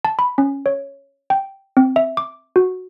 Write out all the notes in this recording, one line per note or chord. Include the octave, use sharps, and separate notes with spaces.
A5
B5
C#4
C#5
G5
C4
E5
D6
F#4